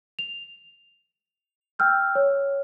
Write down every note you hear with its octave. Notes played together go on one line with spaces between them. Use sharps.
F7
G5 E6 F6 G6
C#5